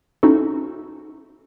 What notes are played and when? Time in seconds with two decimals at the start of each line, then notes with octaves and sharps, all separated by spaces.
0.23 C#4 D#4 E4 F#4 A4